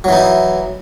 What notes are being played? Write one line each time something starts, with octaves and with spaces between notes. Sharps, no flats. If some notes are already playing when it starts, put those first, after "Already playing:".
E3 F#3 D#4 E4